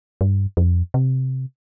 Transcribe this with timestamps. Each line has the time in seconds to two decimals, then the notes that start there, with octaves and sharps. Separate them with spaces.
0.21 G2
0.57 F2
0.94 C3